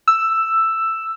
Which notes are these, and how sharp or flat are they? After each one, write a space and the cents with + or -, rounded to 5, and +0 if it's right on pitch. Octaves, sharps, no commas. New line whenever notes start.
E6 +5